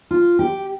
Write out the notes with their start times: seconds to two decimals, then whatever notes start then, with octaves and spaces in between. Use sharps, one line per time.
0.11 F4
0.39 G4